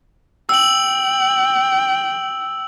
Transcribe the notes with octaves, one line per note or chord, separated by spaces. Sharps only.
G5 E6 F#7